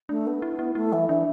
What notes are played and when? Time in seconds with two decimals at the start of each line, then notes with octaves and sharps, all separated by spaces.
0.09 A3 D4
0.26 B3
0.42 E4
0.59 E4
0.75 A3 E4
0.92 E3
1.08 E3 D4